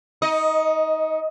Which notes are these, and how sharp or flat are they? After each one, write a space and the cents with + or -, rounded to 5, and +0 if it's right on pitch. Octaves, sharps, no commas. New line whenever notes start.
D#4 +25 D#5 +0